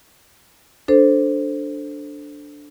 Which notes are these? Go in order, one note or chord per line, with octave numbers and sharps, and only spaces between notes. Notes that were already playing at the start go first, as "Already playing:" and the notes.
D4 A4 C5